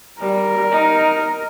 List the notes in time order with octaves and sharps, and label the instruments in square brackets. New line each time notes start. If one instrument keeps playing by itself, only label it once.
[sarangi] G3 [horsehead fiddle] A#4
[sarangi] D#4